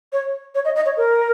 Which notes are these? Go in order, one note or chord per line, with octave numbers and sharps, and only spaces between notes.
C#5
C#5
D#5
D#5
C#5
A#4